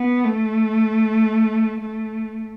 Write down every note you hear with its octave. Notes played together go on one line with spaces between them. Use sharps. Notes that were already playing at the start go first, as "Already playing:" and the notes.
Already playing: B3
A3
A3